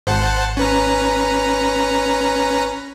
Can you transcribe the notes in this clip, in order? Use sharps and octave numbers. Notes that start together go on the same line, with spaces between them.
G#1 C5 F#5 A5
C#4 B4 A#5